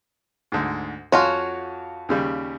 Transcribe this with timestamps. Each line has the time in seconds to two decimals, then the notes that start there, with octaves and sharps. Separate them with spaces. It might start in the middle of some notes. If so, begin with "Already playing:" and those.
0.52 D2 G#2
1.12 F2 F4 F#4 C#5 G#5
2.09 D#2 C#3 G3